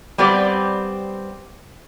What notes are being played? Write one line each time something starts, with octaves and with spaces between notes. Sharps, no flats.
G3 B3 C4 G4 D5